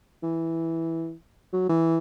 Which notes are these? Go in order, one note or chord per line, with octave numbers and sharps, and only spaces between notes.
E3
F#3
E3